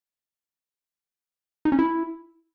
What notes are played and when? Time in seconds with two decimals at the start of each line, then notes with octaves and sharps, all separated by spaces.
1.65 D#4
1.72 C#4
1.79 E4